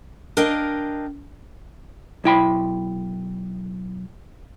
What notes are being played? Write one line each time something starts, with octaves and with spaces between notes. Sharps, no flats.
D4 A#4 D#5 F5 G5
B1 E4 G5 B5